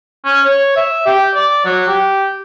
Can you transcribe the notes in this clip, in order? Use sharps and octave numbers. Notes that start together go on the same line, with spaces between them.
C#4
C#5
E5
G4
D5
F#3
G4